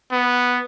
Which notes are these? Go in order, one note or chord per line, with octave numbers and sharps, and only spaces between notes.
B3